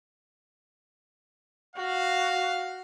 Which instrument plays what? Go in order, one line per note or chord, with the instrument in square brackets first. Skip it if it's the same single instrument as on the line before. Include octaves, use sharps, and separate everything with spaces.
[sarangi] F#4 [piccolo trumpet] F5